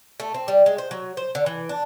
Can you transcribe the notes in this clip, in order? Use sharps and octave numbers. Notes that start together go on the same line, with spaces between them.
A3
C4
G3
G#3
C5
F#3
C5
D3
E3
D4